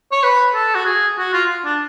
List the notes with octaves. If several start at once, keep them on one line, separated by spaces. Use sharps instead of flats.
C#5
B4
A4
F#4
G#4
F#4
F4
D4